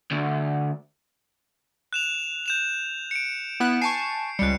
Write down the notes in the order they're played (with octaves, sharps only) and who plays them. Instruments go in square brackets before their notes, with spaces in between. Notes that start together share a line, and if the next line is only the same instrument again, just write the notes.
[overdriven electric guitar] D2
[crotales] F#6 E7 F7
G6 E7 F7
C#7 D7
[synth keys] B3 E4 F#6
[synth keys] G#5 A5 C#6 [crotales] C7
[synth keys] C#2 G3 [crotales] F#6 C#7